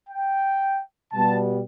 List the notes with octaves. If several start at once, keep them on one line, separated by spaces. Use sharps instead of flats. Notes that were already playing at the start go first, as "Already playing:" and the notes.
G5
B2 G3 B3 A5